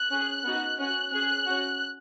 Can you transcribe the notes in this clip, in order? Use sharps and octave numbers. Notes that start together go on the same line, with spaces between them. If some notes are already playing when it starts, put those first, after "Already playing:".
Already playing: F#6
C#4 G#4
B3 D#4 F#4
C#4 F#4 F#6
C#4 G#4 F#6
C#4 F#4